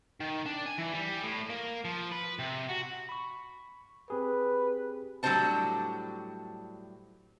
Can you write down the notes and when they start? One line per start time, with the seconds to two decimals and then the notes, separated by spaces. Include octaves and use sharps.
0.21 D#3
0.46 D4
0.66 G#5
0.78 E3
0.93 G3
1.23 A2
1.50 A#3
1.85 F3
2.12 B4
2.39 C3
2.70 F#4
3.09 B5 C#6
4.10 C4 G4 G#4 B4
5.23 A2 F#3 G3 D4 C5 A5